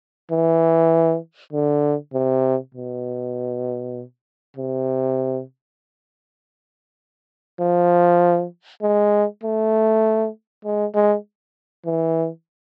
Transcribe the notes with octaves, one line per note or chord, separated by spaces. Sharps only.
E3
D3
C3
B2
C3
F3
G#3
A3
G#3
G#3
E3